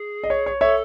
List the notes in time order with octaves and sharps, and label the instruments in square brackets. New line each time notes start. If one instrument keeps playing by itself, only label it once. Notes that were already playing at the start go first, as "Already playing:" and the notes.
Already playing: [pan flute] G#4
[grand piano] D#5
C#5
C#5
[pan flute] A4 [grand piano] C#5 E5